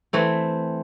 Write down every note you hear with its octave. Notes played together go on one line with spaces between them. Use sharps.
E3 A3 C4